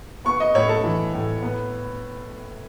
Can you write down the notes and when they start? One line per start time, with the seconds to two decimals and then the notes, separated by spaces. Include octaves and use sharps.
0.25 B3 C#6
0.40 D#5
0.54 A2 C#5
0.69 A4
0.84 E3
1.14 A2
1.42 B3